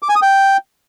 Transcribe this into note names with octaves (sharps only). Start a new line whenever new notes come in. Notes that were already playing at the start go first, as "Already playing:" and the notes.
D6
G#5
D#6
G5